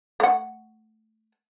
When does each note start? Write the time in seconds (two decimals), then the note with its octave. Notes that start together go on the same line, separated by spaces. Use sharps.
0.20 A3 F#5